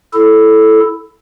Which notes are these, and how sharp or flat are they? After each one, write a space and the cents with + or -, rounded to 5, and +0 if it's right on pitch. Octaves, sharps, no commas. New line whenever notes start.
E4 +5 A4 -5